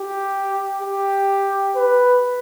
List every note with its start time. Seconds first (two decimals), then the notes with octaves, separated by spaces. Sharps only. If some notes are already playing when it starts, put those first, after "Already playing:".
Already playing: G4
0.81 G4
1.76 B4